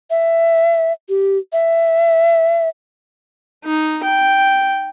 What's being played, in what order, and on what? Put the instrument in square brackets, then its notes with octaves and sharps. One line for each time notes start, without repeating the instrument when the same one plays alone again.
[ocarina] E5
G4
E5
[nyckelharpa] D#4
G5